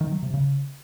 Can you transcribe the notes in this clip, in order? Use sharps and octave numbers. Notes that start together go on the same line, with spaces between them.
D#3
F#3
C3
C#3